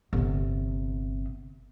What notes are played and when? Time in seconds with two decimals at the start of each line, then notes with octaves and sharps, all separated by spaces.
0.13 G1 C3